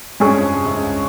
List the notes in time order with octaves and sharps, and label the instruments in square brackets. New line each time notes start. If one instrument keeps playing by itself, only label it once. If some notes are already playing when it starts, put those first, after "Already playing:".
[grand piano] G2 G3 [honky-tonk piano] G#3 C#4 G#4 C#5
[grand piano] F2 F3
C#3
C3
C#2 C#3